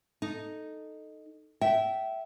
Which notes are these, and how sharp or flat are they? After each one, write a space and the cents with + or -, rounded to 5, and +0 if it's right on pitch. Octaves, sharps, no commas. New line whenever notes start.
D#4 -5 A4 +0
E5 +0 G5 -25